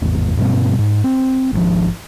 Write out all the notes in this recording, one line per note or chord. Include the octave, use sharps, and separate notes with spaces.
G#1 E2
G2 B2 G3 C4
G#2
C4
G#1 B2 F3